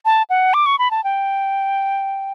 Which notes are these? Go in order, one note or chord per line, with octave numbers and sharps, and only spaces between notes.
A5
F#5
D6
C#6
B5
A5
G5